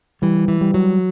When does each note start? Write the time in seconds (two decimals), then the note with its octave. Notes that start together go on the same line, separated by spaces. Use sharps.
0.22 E3 G3
0.48 E3
0.61 G3
0.74 F#3